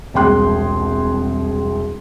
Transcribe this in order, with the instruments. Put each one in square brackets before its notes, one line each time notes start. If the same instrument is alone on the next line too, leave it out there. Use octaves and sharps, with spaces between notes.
[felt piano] E1 C2 G#4 G5 C6 F#6